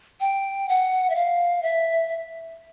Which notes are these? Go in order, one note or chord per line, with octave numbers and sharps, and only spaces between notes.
G5
F#5
E5
F5
E5